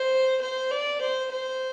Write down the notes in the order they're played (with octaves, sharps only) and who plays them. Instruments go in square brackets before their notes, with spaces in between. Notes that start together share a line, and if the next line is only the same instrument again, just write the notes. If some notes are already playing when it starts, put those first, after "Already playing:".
Already playing: [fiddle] C5
C5
D5
C5
C5